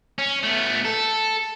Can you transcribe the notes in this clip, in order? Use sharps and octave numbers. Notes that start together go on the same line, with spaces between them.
C#4
A3 B3
A4